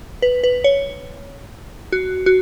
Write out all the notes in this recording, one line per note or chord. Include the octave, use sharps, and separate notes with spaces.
B4
B4
C#5
F#4
F#4